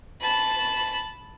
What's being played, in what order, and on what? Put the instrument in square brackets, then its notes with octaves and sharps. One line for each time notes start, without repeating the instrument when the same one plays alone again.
[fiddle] A5 B5